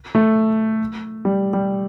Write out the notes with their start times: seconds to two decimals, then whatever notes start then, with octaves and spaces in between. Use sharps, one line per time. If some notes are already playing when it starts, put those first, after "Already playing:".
0.15 A3
1.25 G3
1.53 G3